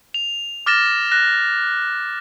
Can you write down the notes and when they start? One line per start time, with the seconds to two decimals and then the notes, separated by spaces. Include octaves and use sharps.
0.14 F7
0.66 D6 F6 A6 A#6 E7
1.12 F#6 A#6